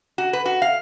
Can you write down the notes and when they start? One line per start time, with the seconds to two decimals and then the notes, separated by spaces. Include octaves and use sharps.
0.18 F#4
0.33 B4
0.46 F#4
0.62 F5